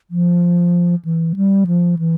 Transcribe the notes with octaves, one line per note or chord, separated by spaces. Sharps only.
F3
E3
G3
F3
E3